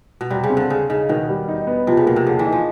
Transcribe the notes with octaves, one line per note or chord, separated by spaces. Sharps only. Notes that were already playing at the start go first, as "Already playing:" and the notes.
B2
C3 G3
C#3
C4
D3
C#3 G#4
C#3 D#4
B2 D#3
G3
D#4
B3
C3 F3
C#3
B2 A#3
C3
D3 G#4
E3
D#4
F3